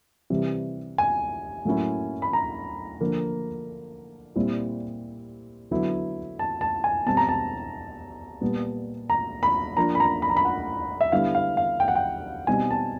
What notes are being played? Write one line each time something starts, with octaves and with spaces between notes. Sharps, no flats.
C3 E3 G3
G#5
A2 F#3 A#3 C#4 E4
B5
A#5
D3 F3 A#3
A#2 G3 C4 E4
D3 F#3 B3 E4
A5
A5
G#5
B2 G3 C4 A5
A#5
A5
A#2 G3 B3
A#5
B5
F3 A#3 D4 F4 A#5
B5
A#5
B5
A#5
B5
F#5
E5
D3 G3 B3 E4 F5
F5
F5
G5
F#5
G5
B2 G3 C4 D#4 G#5
A5